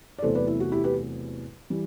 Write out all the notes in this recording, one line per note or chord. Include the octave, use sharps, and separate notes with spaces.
D5
E2 C3 F#3 A3 A4 C5
B4 D5
E4
F#4
E4 G4
G4 B4
E3 G3